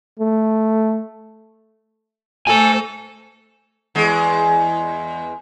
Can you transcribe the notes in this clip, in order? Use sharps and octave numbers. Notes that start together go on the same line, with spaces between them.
A3
A3 A4 C5 G#5
E2 G#3